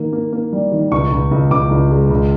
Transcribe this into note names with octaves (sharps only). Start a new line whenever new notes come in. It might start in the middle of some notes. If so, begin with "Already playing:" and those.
Already playing: D#3 A#3
A#3
A#3
G3
D#3
C#2 C#6
C#2
C#2
C#2 D6
C#2
G#3
C#2